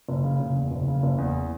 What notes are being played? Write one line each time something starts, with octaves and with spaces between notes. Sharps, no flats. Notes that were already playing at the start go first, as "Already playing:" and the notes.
F#1
C#3
F#1
E2
F#1
C#3
F#1
E2